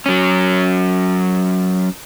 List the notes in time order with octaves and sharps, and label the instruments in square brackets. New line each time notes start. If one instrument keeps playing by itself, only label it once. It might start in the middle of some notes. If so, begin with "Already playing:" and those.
[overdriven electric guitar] F#3 C#4